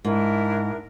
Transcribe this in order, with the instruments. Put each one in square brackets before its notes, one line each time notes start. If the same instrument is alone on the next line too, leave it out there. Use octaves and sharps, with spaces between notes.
[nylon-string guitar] G#2 [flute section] D4 E4 A#4